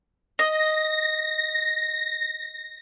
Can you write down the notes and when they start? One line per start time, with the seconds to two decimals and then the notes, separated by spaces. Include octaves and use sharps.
0.39 D#5 A#6